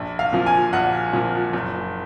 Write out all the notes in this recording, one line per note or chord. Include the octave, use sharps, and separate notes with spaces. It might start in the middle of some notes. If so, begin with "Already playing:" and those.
Already playing: A#1
F5
A#2 F3
G#5
A#1 F#5
A#2 F3
F#1